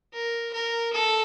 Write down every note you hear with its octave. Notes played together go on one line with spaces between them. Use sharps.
A#4
A#4
A4